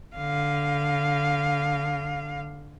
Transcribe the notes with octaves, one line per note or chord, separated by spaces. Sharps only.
D3 F5